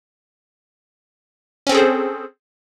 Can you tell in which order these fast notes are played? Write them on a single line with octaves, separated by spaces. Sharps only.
C#4 C4 A4 G#4 C5